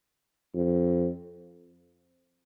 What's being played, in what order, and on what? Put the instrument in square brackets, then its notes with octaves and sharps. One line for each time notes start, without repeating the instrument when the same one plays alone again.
[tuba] F2